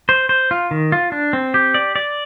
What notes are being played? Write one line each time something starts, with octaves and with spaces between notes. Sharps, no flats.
C5
C5
F4
D#3
F4
D4
C4
G4
D5
D5